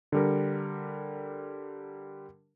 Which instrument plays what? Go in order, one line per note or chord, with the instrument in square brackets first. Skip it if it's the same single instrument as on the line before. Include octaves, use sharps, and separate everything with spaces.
[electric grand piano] D3 G3 A#4